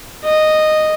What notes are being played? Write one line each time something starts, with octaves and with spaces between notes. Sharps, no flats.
D#5